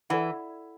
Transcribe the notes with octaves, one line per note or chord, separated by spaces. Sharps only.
E3 A4 D5 F#5